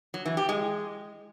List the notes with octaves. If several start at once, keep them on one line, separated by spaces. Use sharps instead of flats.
F#3
E3
G4
G#3